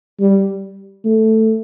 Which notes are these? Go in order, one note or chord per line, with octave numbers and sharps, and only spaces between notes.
G3
A3